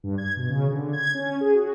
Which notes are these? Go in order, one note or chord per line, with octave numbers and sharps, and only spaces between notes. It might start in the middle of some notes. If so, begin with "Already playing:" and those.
G2
G#6
B2
C#3
D3
G#6
C#4
G#4
F#4